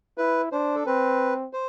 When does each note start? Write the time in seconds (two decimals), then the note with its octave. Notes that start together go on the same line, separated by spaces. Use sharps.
0.18 E4 B4
0.52 D4 C5
0.75 A4
0.86 C4 B4
1.53 C5